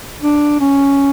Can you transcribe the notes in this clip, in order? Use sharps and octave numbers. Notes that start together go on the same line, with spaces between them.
D4
C#4